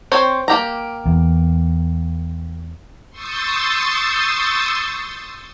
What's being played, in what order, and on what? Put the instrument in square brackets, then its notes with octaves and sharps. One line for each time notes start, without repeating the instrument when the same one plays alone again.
[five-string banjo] C4 C5 C#5
A#3 G4 A#5
[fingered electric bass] E2
[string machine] C6 C#6 D#6 E6 G6 A6